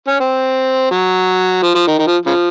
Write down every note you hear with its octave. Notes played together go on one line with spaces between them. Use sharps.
C#4
C4
F#3
F3
F3
D#3
D#3
F3
C#3 F3